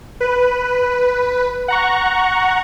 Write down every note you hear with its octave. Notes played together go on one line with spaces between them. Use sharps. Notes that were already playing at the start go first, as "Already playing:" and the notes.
B4
F#5 A#5 C#6